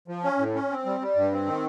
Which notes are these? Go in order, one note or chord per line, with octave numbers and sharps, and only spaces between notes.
F3
C#4
A2
C#4
C4
G3
G3
G2
C4
D#3